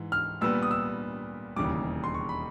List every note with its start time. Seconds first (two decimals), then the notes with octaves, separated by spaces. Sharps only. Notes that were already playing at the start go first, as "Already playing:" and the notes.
Already playing: G#2 E3
0.12 F6
0.41 A#2 G3 B3 E6
0.63 D#6
0.71 E6
1.56 E1 D#2 C#3 E3 G3 D6
2.04 C6
2.14 C#6
2.29 B5